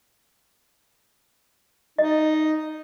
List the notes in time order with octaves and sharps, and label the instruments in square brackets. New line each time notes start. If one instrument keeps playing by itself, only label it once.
[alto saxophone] D#4 [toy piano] D#5